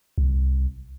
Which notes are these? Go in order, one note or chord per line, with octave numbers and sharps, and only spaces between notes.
C2